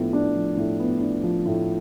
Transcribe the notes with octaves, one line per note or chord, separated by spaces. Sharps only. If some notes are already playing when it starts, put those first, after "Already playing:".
Already playing: A2 F3 B3 D4
D4
F3
A2
B3
D4
F3
A2